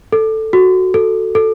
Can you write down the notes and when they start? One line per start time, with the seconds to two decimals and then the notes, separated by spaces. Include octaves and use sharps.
0.12 A4
0.53 F#4
0.94 A4
1.35 A4